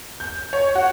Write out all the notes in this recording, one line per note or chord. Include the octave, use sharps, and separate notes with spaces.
G6
C#5
F#4